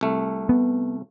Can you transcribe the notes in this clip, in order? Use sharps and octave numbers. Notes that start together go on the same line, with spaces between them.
C2 A3
B3